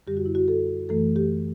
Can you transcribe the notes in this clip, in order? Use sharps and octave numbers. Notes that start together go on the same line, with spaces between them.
F#2 D3 G3 G4
F#4
E4
F#4
A4
F#2 E3 A3 A4
G4